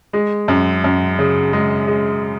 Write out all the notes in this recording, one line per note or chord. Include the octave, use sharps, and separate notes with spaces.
G#3
F#2
F#2
C#3
G#3
G#3